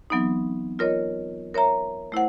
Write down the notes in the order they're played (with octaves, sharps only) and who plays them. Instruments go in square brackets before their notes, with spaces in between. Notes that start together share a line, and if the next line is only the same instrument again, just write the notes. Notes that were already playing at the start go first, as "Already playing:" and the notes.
[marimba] E3 F#3 B3 C4 D#4
F4 A#4 C#5 D#5
A#4 C#5 E5 A#5
A3 E4 C5 F#5